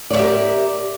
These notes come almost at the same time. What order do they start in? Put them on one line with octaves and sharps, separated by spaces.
D5 C#5 E5 G4 A#4